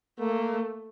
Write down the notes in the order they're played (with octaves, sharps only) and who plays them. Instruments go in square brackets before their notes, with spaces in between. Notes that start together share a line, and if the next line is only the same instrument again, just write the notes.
[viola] A3 [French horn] A#3